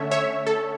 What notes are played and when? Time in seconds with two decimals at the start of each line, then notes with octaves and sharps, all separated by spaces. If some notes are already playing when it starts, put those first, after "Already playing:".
Already playing: D3 A3 C#4 C#5 E5
0.11 C#5 E5
0.47 A4